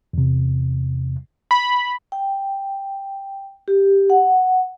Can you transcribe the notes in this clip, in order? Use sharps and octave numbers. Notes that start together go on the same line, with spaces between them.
E2 C3
B5
G5
G4
F#5